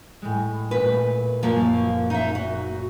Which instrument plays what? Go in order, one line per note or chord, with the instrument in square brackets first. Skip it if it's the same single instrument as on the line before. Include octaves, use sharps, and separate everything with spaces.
[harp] A2 G#3
[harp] A#2 A3 [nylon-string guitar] B4
[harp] F#1 F#2 [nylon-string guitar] F3 A#3
[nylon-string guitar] D#4 E5
F#4